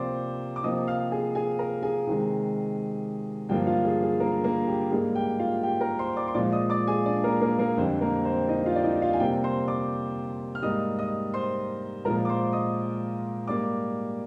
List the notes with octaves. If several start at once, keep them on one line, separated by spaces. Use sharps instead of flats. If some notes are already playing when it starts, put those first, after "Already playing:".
Already playing: C3 F3 A#3 C5 D5 C6 D6
D6
C3 F3 A#3 D#5 D#6
F5 F6
G#4 G#5
G#4 G#5
A#4 A#5
G#4 G#5
C3 D#3 G#3
G2 D3 F3 A#3 G4 G5
F4 F5
G#4
G#4
A#3 A#4
A#3 A#4
G4
G#2 G3 A#3 G#4
G4 G5
F4 F5
G4 G5
A#4 A#5
C5 C6
D5 D6
C6
A#2 F3 G#3 D5 D6
D#5 D#6
D5 D6
G#4 G#5
D4 D5
A#3 A#4
A#3 A#4
A#3 A#4
F2 D3 G3 C4 C5
A#3 A#4
C4 C5
D#4 D#5
F4 F5
D5
D#4 D#5
F4 F5
G#5
C3 G3 A#3 G4 G5
C5 C6
D5 D6
F6
G#2 G3 A#3 D#5 D#6
D#5 D#6
C5 C6
A#2 F3 G#3 A#4 A#5
D6
C5 C6
D#5 D#6
G#2 G3 A#3 D5 D6